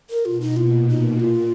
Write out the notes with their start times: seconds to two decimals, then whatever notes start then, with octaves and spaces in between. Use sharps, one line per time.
0.10 A#4
0.25 B2 F4
0.41 D#4
0.57 A#2 F4
0.88 A#2 D#4
1.20 A#2 F4